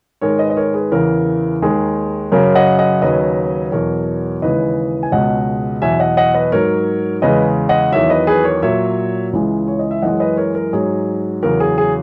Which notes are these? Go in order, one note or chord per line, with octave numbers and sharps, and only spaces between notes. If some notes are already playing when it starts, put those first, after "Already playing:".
G#2 D#3 G#3 A#4 C#5
B4 D#5
D#5
A#4 C#5
G#4 B4
E2 C#3 E3 A#4
D#2 D#3 G#3 G#4
F#2 C#3 F#3 A#4
D#5 F#5
D#5 F#5
D#2 C#3 F#3 B4 D#5
E2 B2 F#3 A#4 C#5
D#2 C#3 E3 G#3 B4 D#5
G#5
C#2 B2 G#3 D#5 F#5
E2 B2 F#3 E5 G#5
D#5 F#5
D#5 F#5
B4 D#5
G#2 F#3 A#4 C#5
E2 C#3 G#3 B4 D#5
D#5 F#5
E2 D#3 F#3 C#5 E5
B4 D#5
G#4 B4
A#4 C#5
A#2 F#3 C#5 E5
C#2 C#3 E3 G#3
C#5
D#5
E5
F#2 E3 G#3 D#5 F#5
B4 D#5
A#4 C#5
A#4
G#2 F#3 G#4
E2 C#3 F#3 A#4
G#4
G#4